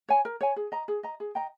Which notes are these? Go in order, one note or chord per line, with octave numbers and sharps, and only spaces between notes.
C#5 G#5
A#4
C#5 G#5
G#4
D#5 A#5
G#4
D#5 A#5
G#4
D#5 G5 A#5